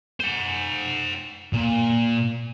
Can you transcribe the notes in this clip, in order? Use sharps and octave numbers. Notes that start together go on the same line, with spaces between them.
C5 F#5
A#2